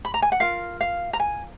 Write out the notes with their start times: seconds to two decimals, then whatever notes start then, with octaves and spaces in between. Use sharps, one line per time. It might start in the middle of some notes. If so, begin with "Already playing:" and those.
0.05 B5
0.14 A#5
0.22 G#5
0.32 F#5
0.40 F4 A#4 F5
0.81 F5
1.13 A#5
1.20 G#5